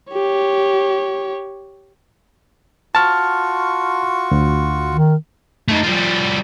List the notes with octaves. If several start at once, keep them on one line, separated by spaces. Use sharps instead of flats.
G4 C#5
F4 F#4 A5 C#6 F6
D2
D#3
A3 D#4
F3 G3